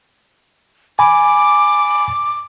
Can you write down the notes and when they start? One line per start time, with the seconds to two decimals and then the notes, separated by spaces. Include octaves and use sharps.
0.99 G#5 B5 D6